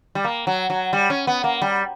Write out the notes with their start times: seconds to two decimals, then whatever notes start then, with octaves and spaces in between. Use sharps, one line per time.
0.15 G3
0.24 A#3
0.47 F#3
0.70 F#3
0.93 G3
1.10 C#4
1.27 B3
1.44 A#3
1.62 G3